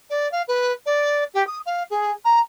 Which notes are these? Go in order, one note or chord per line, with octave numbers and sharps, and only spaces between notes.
D5
F5
B4
D5
G4
D#6
F5
G#4
A#5